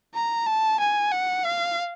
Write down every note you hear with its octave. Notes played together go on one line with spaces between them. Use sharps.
A#5
A5
G#5
F#5
F5